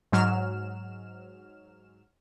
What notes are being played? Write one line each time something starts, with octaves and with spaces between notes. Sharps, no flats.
G#2 F#3 F6 E7